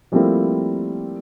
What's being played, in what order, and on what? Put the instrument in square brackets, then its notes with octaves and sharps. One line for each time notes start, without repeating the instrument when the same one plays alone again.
[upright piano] F3 G3 A3 A#3 C4 E4